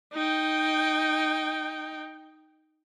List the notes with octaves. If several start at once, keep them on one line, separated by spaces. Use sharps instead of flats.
D#4 G5